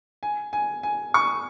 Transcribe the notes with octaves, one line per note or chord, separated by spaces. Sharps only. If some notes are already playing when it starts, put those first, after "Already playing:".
G#5
G#5
G#5
C#6